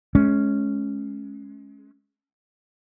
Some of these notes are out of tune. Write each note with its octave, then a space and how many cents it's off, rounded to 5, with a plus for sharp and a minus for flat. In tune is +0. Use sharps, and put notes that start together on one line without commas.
G#3 +30 C#4 +0